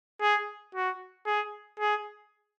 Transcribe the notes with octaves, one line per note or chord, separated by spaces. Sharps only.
G#4
F#4
G#4
G#4